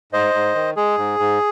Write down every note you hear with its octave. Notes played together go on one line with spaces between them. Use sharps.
G#2 C5 D#5
G#2
D#3
G#3 G#4
G#2
G#2